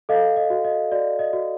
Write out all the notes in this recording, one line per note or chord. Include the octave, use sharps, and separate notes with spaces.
A4 D#5 F5
D#5
F#4
D#5
F#4 D5
D#5
F#4